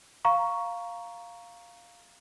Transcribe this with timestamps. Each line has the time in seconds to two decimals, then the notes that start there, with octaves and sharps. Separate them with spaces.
0.25 F5 A#5 C#6